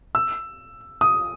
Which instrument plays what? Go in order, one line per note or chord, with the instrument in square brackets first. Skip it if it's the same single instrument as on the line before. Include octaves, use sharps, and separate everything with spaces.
[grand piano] E6
D#6